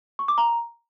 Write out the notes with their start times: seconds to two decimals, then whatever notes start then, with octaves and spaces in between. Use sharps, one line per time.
0.19 C#6
0.28 D6
0.38 A#5